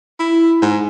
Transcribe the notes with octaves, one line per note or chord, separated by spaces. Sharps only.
E4
G#2